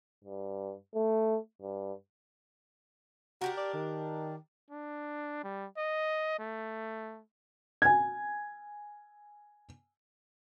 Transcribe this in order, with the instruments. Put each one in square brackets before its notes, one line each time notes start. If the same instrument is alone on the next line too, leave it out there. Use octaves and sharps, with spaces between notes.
[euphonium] G2
A3
G2
[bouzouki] D4 G4 A#4 [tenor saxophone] F#4
[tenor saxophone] D5
D#3
[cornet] D4
G3
D#5
A3
[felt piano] G#5 G#6